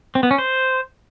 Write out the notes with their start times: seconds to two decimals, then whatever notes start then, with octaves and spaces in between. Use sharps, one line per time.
0.15 C4
0.23 B3
0.31 C#4
0.38 C5